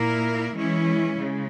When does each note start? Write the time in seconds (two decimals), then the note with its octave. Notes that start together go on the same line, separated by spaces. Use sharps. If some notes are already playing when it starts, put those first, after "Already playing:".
Already playing: A#2 A#3 E4 A#4
0.53 E3 G#3 C#4 E4
1.17 C#3 G#3